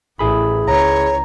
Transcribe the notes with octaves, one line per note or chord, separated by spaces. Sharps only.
A1 E4 G#4 B5
C#2 C#5 A#5